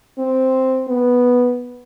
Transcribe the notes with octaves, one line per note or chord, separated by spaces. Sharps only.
C4
B3